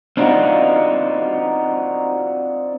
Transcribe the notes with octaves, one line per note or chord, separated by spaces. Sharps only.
C4 D4 D#4 F4 F#4